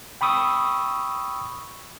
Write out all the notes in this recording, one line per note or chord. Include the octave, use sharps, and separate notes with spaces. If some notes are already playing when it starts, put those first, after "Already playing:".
G5 B5 C#6 D#6 E6